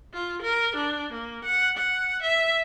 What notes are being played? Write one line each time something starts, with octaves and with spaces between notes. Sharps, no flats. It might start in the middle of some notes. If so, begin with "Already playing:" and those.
F4
A#4
D4
A#3
F#5
F#5
E5